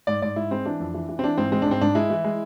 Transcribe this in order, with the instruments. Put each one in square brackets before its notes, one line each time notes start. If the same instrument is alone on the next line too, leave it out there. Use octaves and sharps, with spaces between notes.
[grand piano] G#2 D5
G#2 D5
G#2 E4
G#3 C4
E3 D4
F2
E3
E3
C4
E3 D4
G#2 C4
G#3 C4
D4
G#2 C4
G#2 D4
G#3 E4
E3
G#3